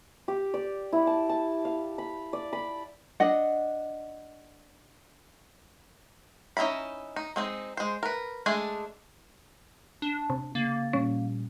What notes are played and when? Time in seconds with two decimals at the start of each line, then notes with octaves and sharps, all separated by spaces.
0.28 G4
0.54 D5
0.92 E4
1.07 A5
1.29 A5
1.65 F5
1.98 B5
2.33 D5
2.53 B5
3.20 D4 D#5 F#5
6.57 C#4 D#4 E4 A#5 B5
7.16 D#4
7.36 G#3 C4 D#4
7.77 G#3 C5
8.03 A#4 B4
8.46 G#3 A3 D4 G#4
10.02 D4
10.30 C3
10.55 C#3 A#3 A6
10.93 A#2 F3 G3 C#4